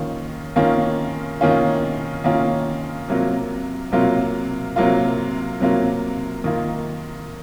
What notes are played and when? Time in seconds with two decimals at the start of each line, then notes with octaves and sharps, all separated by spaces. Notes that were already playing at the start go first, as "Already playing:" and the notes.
Already playing: D#3 A#3 C#4 F4
0.56 D#3 A#3 C#4 F4
1.41 D#3 A#3 C#4 F4
2.24 D#3 A#3 C#4 F4
3.08 C3 F#3 A#3 F4
3.92 C3 F#3 A#3 F4
4.76 C3 F#3 A#3 F4
5.60 C3 F#3 A#3 F4
6.44 D#3 A#3 F4